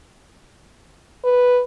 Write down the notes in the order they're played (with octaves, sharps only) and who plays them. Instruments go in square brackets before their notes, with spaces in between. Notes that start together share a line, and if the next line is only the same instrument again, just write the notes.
[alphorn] B4